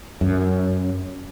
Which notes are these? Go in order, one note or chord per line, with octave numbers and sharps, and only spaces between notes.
F#2